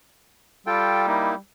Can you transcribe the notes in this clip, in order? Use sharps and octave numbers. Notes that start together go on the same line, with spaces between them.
G3 F4 A4 G5
A#3 D#4 E4